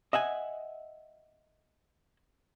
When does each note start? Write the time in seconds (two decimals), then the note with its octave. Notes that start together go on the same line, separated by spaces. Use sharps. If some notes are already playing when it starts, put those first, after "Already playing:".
0.13 D#5 E5 F#5 G#5